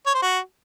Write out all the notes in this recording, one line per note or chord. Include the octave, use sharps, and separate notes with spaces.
C#5
C5
F#4